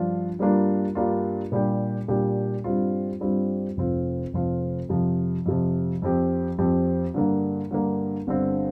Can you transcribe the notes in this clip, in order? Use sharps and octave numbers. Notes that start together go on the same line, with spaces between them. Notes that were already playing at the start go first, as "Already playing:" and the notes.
Already playing: G2 F3 D4 F4
G2 G3 A#3 D4 F4
G2 G3 A#3 D4 F4
A#2 G3 D4 G4
A#2 G3 D4 G4
G2 G3 C4 F4
G2 G3 C4 F4
F1 F2 F3 C4 F4
F1 F2 F3 C4 F4
F2 C3 F3
F2 C3 F3
F2 F3 C4 G4
F2 F3 C4 G4
G2 D3 A#3
G2 D3 A#3
G1 G2 D3 G3 C4